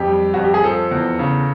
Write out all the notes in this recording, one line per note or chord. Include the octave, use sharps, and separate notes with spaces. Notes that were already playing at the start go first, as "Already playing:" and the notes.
Already playing: F2 G4
G3
F2 F#4
G4
G#4
F3 A4
E2
C#3